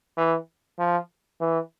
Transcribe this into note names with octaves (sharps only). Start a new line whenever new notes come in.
E3
F3
E3